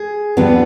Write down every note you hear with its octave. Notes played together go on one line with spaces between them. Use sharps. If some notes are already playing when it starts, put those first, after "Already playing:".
Already playing: G#4
D#2 D3 G3 B3 D4 F4